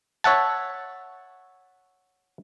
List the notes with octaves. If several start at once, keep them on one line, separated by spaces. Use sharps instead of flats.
C#5 E5 F#5 A5